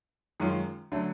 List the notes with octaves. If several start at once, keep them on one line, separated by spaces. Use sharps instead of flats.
F#2 D#3 G#3 C#4 F4
D3 F#3 A3